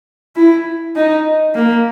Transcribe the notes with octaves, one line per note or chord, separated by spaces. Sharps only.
E4
D#4
A#3